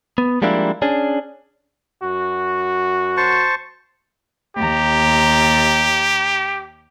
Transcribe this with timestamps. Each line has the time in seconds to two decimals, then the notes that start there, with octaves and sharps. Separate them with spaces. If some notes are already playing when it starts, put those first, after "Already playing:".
0.18 B3
0.42 F3 G3 G#3 A#3 D4 E4
0.82 C#4 D4 G#4
2.03 F#2 F#4
3.17 C5 A5 C#6
4.57 D#2 G4 A#5